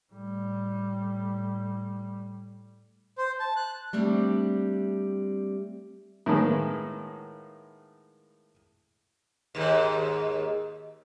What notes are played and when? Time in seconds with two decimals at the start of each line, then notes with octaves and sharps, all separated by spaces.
0.13 A2 G3
3.18 C5
3.40 A5
3.56 F#6
3.93 G3 A3 C4 D4
6.26 A2 D#3 G#3 A#3 B3
9.55 D#2 G#2